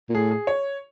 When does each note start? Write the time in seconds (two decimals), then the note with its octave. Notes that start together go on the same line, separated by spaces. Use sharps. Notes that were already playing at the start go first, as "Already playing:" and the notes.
0.09 A#2
0.15 A2 G#4
0.31 G#4
0.47 C#5